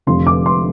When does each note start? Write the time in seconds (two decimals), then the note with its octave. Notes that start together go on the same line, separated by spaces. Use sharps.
0.06 F1 F2 D3 F3 C6
0.27 D6
0.46 C6